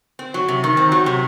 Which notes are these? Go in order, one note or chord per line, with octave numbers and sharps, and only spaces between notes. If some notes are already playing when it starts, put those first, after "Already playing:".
C4
F#3
C3
D#3
C4
F#3
C3